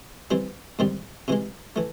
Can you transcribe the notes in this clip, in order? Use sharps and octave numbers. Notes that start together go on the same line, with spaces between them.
E3 G3 C4
G#2 D#3 G3 C4
C3 E3 G#3
E3 A3